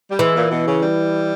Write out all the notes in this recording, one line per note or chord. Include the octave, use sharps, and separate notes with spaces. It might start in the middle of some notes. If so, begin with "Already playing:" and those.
G3
E3 G#3
A#2
B2
C#3
G3